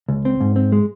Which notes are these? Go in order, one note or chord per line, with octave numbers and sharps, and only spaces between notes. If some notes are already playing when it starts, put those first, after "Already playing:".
C#2
C4
G#2
C4
G#3